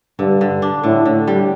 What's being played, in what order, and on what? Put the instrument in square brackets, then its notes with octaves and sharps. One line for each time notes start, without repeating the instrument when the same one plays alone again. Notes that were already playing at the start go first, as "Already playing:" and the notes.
[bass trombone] G2 [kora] D3
[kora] D3
D4
[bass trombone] A2 [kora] D3
[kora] D3
G3